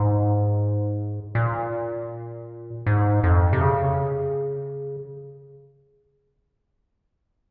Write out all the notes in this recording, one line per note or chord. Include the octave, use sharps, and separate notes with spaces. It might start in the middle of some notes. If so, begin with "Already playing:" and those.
Already playing: G#2
A#2
G#2
F2
C3
C#3